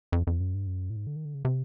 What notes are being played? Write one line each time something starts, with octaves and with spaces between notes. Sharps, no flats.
F2
F2
F#2
G2
F#2
A2
G#2
D3
D#3
D3
C#3
C3